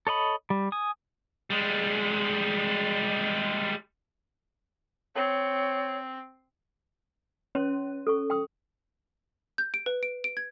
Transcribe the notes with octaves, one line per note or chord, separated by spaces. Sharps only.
A4 C#5 D#5 B5
G3
G#5 D#6
G3 G#3
C4 C#5
C#4 C#5 C6
A4 C#6
G5 C6 D#6
G6
D7
B4
D7
D7
G#6